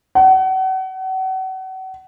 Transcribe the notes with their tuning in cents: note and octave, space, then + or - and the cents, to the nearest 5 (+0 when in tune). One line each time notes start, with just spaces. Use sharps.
F#5 +35